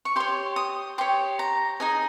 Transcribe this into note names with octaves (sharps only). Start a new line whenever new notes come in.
C#6
G4 C#5 C6
D#6
G4 C#5 C6
A#5
D#4 G#4 D#5 G#5